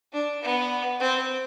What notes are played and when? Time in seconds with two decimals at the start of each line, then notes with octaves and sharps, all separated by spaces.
0.13 D4
0.42 B3
1.00 C4